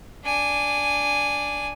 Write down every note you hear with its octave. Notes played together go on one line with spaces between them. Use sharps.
D4 G#5